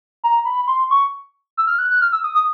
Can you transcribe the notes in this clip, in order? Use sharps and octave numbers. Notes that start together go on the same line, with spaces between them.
A#5
B5
C6
C#6
E6
F6
F#6
F#6
F6
E6
D#6
D#6